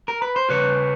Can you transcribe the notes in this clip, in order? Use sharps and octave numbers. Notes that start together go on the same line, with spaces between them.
A#4
B4
C5
C#3 B4 C#5